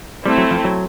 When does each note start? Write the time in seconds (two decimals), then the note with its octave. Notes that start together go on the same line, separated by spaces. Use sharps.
0.25 G3 A3 C4 E4
0.38 F#3
0.51 F3
0.65 F#3